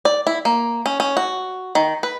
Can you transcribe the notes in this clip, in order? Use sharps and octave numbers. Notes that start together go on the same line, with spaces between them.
D5
E4
A#3
C#4
C#4
F#4
D#3
B4